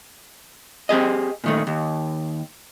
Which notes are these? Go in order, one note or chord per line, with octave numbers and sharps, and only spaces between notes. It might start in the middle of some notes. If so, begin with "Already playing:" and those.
C4 G4 G#4 D#5
A#2 D#3 A3
D#2